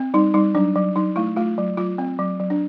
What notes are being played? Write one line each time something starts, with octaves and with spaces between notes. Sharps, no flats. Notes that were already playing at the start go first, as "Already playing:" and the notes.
Already playing: C4
G3 D#4
G3 D#4
F#3 D4
F#3
F#3 D#4
A3 E4
A3 F4
F#3
F#3 F4
C4
F#3
F#3
D4